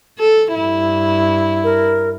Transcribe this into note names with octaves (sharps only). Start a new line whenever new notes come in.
A4
G2 E4
A#4